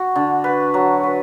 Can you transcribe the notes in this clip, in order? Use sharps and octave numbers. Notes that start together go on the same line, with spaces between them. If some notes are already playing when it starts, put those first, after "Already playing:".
Already playing: F#4
D3
B4
F#3
B4